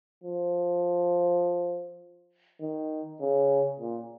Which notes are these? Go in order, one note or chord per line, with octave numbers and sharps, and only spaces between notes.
F3
D#3
C#3
A#2